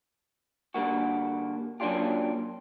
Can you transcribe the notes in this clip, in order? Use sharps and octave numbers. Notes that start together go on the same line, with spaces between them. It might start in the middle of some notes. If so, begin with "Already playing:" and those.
D3 G3 A#3 F#4
F#3 A#3 C#4 D4 F4 G4